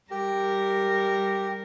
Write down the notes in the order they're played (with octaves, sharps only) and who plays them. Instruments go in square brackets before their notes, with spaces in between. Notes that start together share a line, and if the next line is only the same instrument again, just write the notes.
[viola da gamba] G3 A#4 [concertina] G4